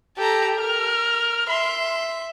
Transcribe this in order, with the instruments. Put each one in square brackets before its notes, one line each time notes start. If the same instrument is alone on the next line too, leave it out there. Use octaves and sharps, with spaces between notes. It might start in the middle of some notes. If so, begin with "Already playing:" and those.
[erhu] G4 [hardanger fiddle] A4 A#5
[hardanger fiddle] A#4 [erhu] F6
[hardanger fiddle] E5 [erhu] C6